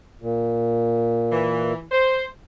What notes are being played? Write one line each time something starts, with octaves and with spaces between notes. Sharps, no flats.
A#2
E3
C5